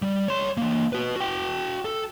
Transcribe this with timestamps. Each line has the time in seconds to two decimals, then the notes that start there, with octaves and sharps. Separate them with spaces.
0.02 G3
0.28 C#5 C6
0.57 E3 A#3
0.93 F#4 B4
1.16 F#4 G5
1.85 A4